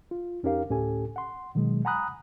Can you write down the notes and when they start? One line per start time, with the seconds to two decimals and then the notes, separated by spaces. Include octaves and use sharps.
0.11 F4
0.43 F2 C#4 D#4 G4 A#4 F5
0.70 D2 A2 C#4 G4 A4 G#5
1.16 F#5 C6
1.55 B2 D#3 F#3 G#3
1.85 F#5 G#5 A#5 B5 D#6 F#6